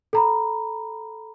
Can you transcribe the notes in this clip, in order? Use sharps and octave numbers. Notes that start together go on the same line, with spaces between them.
A4 A#5 B5